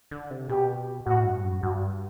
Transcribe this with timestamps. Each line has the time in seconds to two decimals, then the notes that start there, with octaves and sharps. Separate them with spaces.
0.11 D3
0.31 C3
0.49 B2 G4
1.06 A2 F#4
1.25 G2
1.44 F#2
1.63 G2 F#4